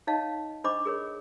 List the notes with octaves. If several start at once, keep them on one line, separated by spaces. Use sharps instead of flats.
D#4 C#5 D#5 F5 A5
D4 C5 D#5 B5 C#6 D6
G#4 A#4 C#5